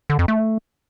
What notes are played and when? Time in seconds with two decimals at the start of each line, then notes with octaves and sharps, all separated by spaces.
0.10 D3
0.19 F2
0.28 A3